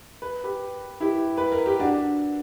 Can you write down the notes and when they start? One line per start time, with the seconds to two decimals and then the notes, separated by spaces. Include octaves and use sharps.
0.22 B4
0.44 G4 B4
1.00 E4 G4
1.38 B4
1.52 A#4
1.66 G4
1.79 D4 F#4